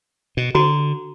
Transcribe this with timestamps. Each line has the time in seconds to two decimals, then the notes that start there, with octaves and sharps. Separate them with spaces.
0.37 B2
0.55 D3 F#4 A#5